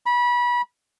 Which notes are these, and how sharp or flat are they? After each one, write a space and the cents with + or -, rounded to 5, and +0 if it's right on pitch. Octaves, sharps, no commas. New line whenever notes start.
B5 -25